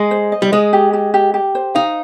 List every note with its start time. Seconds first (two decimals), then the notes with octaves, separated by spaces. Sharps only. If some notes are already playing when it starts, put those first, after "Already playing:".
Already playing: G#3 D#5
0.11 C5
0.32 D#5
0.42 G3
0.52 G#3 D#5
0.73 G4
0.93 G4
1.14 G4
1.34 G4
1.55 C5
1.75 D#4 F5